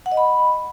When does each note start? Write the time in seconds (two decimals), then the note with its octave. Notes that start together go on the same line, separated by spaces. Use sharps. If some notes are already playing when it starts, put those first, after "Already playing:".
0.06 F#5
0.12 D#5
0.17 B5